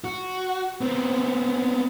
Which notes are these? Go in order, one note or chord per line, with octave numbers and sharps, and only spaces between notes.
F#4
B3 C4